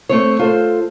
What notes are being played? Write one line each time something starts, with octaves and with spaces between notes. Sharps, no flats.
A3 C4 C#5
F4 A4 C5